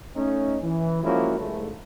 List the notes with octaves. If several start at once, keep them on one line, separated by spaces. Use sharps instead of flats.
A3 C#4 D#4
E3
F3 G#3 A#3 C#4 E4 F#4
C2 G#2 A3